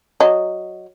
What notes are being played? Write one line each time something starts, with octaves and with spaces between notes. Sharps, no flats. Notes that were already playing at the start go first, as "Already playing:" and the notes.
F#3 D#5